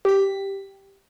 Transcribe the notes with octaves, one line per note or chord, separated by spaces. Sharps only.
G4 B6